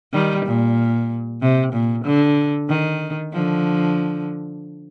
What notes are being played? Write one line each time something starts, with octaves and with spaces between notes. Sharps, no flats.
D#3 G3
A#2
C3
A#2
D3
D#3
D3 F3